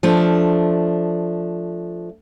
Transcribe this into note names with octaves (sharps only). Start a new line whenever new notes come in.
F3 A3 D4